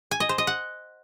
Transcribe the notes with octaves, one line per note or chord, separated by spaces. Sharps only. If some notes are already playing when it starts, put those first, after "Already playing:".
G#5
D#5
C5
D#5
F#5